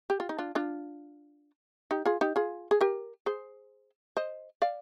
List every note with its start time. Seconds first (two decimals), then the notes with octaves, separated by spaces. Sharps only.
0.10 G4
0.20 F4
0.29 D#4
0.39 D4 F4
0.55 D4 F4
1.91 D#4 G4
2.05 F4 G#4
2.21 D#4 G4
2.36 F4 G#4
2.71 G#4
2.81 G4 A#4
3.26 G#4 C5
4.17 C5 D#5
4.62 D5 F5